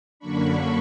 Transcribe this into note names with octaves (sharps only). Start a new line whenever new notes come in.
F#2 D3 F#3 A#3 D4 B5 C#6